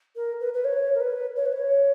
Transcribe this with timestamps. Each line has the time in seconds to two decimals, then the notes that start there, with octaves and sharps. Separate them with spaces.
0.16 A#4
0.40 B4
0.54 B4
0.64 C#5
0.94 A#4
1.00 B4
1.36 C#5
1.45 B4
1.52 C#5